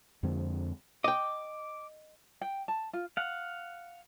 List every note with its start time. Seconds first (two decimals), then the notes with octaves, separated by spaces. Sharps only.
0.23 F2 D3 G#3 C4
1.04 D#5 G5 D6
2.41 G5
2.68 A5
2.93 F4
3.17 F5 F#5